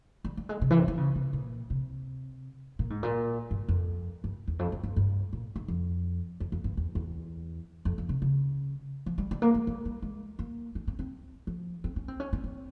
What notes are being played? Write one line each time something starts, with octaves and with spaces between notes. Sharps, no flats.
G3
G3
G#3
C3
E3
C3
E3
C#3
C3
A#2
C3
A#2
G#2
A#2
G2
F2
G2
E2
F2
G2
G2
G2
A#2
G#2
F2
F2
F2
G2
E2
E2
F2
F2
C3
C#3
F3
G3
G3
A#3
G#3
G3
G3
G#3
A#3
C#4
C4
C4
F3
C4
C#4
C4
C#4
C4
C4